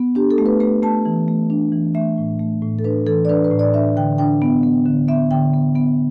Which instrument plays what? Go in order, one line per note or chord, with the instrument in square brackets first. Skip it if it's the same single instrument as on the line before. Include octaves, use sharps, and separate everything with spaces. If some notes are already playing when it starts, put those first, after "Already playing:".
Already playing: [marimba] B3
D4 G4
A4
A3
B4
A3 B4
A3 A5
E3
A3
D4
E3
A3 E5
A2
A3
A2
A4
D4 B4
E3 A4
D5
D4 B4
B4
A2
D5
D4 E5
D3 G5
D4 G5
B3
B3
D3
B3 E5
D3 G5
B3
B3